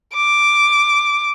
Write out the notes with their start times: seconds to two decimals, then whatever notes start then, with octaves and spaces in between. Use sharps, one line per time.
0.15 D6